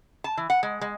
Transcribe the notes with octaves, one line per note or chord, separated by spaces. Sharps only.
A5
E3
F#5
G#3
G#3